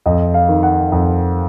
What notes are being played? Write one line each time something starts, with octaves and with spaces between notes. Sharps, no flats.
F2 D#5
F5
D#3
F#5
F2